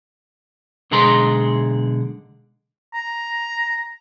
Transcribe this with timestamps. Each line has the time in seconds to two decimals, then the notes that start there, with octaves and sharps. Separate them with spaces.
0.91 B1 D3 G#3 G#4 A#5 C6
2.94 A#5